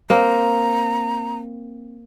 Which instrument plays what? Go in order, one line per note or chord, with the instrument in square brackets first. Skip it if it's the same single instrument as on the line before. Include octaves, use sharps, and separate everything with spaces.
[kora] A#3 C4 [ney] A#5